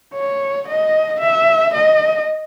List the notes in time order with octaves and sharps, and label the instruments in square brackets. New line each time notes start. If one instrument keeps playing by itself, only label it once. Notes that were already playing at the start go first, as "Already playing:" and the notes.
[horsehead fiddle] C#5
D#5
E5
D#5